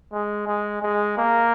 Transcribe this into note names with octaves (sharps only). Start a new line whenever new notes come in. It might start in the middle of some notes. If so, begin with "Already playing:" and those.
G#3
G#3
G#3
A#3